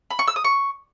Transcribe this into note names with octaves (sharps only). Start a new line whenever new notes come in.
B5
C#6
E6
D#6
C#6